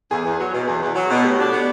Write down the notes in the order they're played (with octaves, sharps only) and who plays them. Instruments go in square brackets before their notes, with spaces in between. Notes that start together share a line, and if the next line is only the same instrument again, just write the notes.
[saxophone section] E2 [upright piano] G#4
[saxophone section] E2
F#3
B2
[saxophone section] E2 [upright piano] G#4
[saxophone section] E2
F#3
B2
[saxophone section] A2 [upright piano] G4
[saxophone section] D4
B3